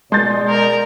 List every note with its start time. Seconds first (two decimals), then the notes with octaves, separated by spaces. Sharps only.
0.12 B2 G#3 D5 C6 G6 A6
0.49 A#4